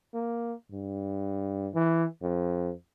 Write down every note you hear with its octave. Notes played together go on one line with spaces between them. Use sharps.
A#3
G2
E3
F2